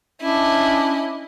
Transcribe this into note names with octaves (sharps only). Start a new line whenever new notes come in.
C#4 D4 E4 D#5